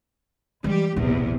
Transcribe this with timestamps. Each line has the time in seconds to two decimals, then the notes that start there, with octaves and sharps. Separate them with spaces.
0.64 E3 G3 G#3 G4
0.96 D1 B1 E2 C3